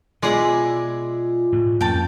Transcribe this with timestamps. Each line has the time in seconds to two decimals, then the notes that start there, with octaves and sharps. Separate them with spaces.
0.23 B2 G#3 E4 F4 G#4 D5
1.52 A2
1.81 F2 A#3 C#4 G5 A5